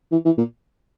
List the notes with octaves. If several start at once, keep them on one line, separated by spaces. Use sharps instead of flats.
E3
E3
A#2